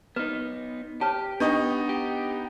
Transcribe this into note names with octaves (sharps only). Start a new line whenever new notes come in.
B3 D#4 B4
G4 B4 C#5 A5
B3 D4 D#4 D#5 C#6
G4